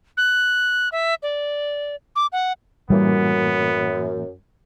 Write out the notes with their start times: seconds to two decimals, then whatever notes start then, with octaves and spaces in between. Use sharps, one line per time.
0.17 F#6
0.92 E5
1.23 D5
2.16 D6
2.32 F#5
2.90 F#2 A2 E3 G3 A#3 B3